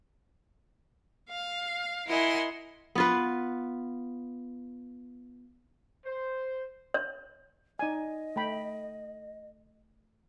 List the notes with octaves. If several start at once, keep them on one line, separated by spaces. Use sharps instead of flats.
F5
E4 A#4 D#5 F#5 G#5 C6
B3 F4 B4
C5
C#5
D#4 D5 D#5 G#5
A3 G5 B5